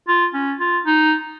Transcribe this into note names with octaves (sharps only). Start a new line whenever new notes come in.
F4
C#4
F4
D#4